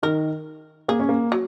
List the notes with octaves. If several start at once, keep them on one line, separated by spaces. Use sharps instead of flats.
D#3 A#4
A#3 G#4
C#4
A#3
F#3